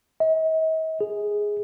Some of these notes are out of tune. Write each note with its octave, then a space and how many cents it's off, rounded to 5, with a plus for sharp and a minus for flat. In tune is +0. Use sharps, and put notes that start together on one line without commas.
D#5 +45
G#4 -5